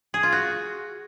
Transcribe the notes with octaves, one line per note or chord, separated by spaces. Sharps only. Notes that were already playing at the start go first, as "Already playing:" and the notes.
G#4
F4
F#4